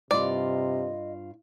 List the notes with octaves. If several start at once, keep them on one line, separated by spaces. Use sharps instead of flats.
G2 C3 F4 D5 D#5